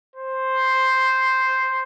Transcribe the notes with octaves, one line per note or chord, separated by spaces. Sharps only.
C5